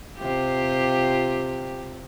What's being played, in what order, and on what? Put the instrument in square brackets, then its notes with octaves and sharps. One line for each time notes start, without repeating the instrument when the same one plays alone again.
[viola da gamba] C3 F4 G4